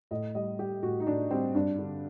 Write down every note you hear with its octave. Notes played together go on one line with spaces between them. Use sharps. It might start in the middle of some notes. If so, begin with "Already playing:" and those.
A2 D#5
G3 D#5
G3 G4
A2 F#4
D#4
A2 D4
G3 C4
G2 D4
D3